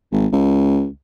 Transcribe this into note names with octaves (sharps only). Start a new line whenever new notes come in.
G#1
C#2